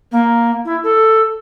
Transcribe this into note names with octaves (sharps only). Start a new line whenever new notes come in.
A#3
E4
A4